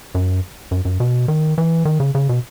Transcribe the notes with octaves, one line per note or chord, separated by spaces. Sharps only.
F#2
F#2
F#2
B2
D#3
E3
D#3
C#3
C#3
B2